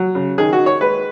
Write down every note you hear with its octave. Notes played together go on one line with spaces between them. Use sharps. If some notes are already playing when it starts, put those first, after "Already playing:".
Already playing: F#3
C#3
D#3 G#4
F#4
D#3
C#5
G#3 B4